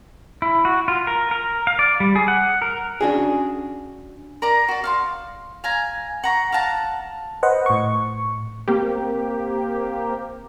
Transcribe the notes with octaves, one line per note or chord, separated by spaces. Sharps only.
E4
F#4
F4
A#4
A#4
F5
D5
G3
G#4
F#5
A#4
C#4 D4 F#4 G#4
A#4 D5 A#5
F#4 D5
F5 F#5 C6
F5 G#5 A#5
F#5 A#5 C#6
F5 F#5 A5 A#5
B4 C5 D#5 F#5
A2 C#6
A#3 C4 G4